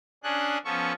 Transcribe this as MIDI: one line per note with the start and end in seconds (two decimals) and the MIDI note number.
0.23 0.58 61
0.23 0.58 62
0.23 0.58 68
0.23 0.58 90
0.65 0.93 53
0.65 0.93 59
0.65 0.93 61
0.65 0.93 69
0.65 0.93 85